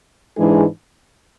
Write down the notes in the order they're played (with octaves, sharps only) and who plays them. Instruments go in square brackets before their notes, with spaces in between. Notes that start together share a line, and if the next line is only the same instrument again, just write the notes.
[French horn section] G#2 E3 G#3 D4 G#4